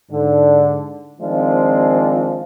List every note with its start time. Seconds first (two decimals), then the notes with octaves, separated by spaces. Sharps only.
0.11 G#2 D3
1.21 D#3 F3 G#3 C4 D4 F4